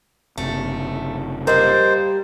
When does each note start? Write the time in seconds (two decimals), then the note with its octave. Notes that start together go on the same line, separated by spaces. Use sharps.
0.38 F#1 C3 A3
1.47 G3 A#3 A#4 C5 D#5